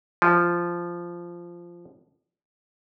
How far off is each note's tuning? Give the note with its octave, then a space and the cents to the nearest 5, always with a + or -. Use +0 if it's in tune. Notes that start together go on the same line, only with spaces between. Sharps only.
F3 -10